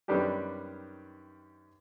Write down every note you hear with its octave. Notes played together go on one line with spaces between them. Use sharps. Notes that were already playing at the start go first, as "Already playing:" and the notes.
F#2 D#3 G3 B3 D4 G4